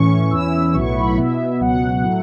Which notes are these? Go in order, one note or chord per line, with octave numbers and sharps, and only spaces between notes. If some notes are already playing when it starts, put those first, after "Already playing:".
Already playing: A2 E3 C#4 C#6
E2 E3 C#4 E4 E6
E6
B1 A2 F#3 B3 E4 C#6
B5
B2 B3 E4 E5
C#2 B2 F#3 B3 F#5
A2 F#3 A3 E4